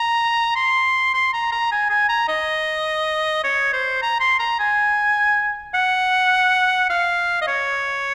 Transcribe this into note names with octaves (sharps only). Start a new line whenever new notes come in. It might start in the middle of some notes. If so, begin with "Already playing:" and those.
Already playing: A#5
C6
C6
A#5
A#5
G#5
G#5
A#5
D#5
C#5
C5
A#5
C6
A#5
G#5
F#5
F5
D#5
C#5